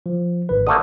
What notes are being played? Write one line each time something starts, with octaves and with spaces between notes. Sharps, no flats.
F3
G#1 D#3 B4
D3 A3 A#3 D#6